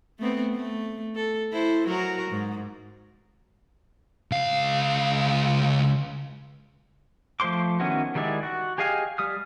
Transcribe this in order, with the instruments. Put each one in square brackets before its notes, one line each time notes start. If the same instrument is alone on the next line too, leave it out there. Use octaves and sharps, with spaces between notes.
[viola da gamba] A3 B3 C4
A3
A4
E4 A4 C5
F#3 F#4 A#4
G#2
[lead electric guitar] C#2 F5
[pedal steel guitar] F3 A3 C5 C6 D6
D#3 B3 C#4 E4 F#4
D#3 G3 G#3 E4 D5
F#4
G4 G#4 D#5 F5 G#5
G3 D#6 F6